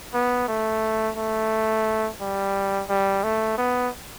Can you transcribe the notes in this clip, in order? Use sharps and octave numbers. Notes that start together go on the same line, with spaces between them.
B3
A3
A3
G3
G3
A3
B3